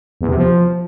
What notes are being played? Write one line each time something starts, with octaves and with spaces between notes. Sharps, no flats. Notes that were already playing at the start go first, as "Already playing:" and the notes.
E2
C3
F3